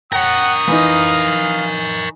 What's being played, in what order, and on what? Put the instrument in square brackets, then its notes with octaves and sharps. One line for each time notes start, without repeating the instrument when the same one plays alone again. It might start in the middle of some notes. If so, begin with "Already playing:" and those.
[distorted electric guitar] A#4 C#5 [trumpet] F#5 [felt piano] G5 [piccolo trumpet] D#6
[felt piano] E3 D#4 [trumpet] F5